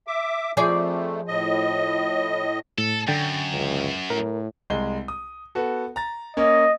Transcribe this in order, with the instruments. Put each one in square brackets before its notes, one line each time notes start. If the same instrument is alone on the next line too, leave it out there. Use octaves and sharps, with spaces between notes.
[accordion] E5 D6
[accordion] F2 A3 [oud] F3 G#4 D5
[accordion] A2 D#5
[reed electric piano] A2 [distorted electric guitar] A4
[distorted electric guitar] F#2 [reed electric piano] D3 G5 A6
[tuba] C#2
[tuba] A2 [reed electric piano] A#4
[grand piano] C2 G#3 G7
D#6
B3 F#4 A4
A#5 A6
[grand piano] A#3 C#4 [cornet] D#5